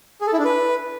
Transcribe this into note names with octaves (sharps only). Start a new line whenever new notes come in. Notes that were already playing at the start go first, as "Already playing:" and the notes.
G#4
A4
E4
D4
B4